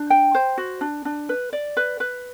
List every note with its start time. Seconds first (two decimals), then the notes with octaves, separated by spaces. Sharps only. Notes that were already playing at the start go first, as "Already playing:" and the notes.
Already playing: D4
0.10 G5
0.35 C5
0.58 F#4
0.81 D4
1.05 D4
1.29 B4
1.53 D5
1.77 B4
2.00 B4